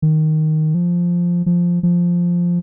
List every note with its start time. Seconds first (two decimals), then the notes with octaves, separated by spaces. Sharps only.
0.02 D#3
0.75 F3
1.46 F3
1.83 F3